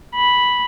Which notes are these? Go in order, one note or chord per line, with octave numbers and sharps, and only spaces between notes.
B5